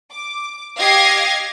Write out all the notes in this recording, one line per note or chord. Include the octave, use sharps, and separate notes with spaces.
D6
G4 D#5 F5 G#6 A#6 C7